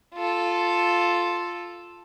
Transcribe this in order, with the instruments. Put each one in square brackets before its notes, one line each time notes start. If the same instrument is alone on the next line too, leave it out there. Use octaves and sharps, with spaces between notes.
[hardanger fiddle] F4 A4